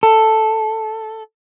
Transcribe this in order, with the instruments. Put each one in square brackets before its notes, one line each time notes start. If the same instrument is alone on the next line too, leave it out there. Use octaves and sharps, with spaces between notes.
[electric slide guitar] A4